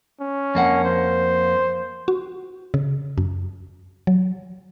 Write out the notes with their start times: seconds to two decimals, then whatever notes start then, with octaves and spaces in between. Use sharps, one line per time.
0.20 C#4
0.55 F2 A#3 F#5
0.85 C5
2.08 F#4
2.74 C#3
3.18 F#2
4.07 F#3